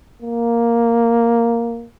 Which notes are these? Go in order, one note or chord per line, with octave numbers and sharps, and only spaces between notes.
A#3